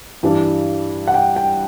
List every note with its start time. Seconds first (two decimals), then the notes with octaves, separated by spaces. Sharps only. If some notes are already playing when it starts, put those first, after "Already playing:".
0.23 G2 E3 G3 D4
1.08 F#5
1.14 G5
1.36 G5